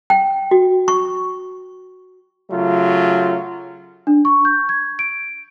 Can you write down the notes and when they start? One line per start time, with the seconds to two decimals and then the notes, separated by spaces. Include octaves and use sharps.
0.10 G5
0.51 F#4
0.88 C#6
2.51 C#3 F#3 A3 F4
4.07 D4
4.25 C#6
4.45 G6
4.69 G#6
4.99 D7